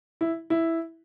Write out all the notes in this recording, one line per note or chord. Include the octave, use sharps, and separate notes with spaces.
E4
E4